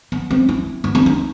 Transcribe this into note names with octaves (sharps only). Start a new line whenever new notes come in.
B3
C4
E4
B3
C4
D#4